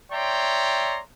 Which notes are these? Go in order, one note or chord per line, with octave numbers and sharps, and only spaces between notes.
C#5 D5 E5 G5 A#5 C6